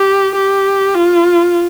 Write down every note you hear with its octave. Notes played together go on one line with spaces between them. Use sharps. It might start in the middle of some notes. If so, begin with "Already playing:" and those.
Already playing: G4
G4
F4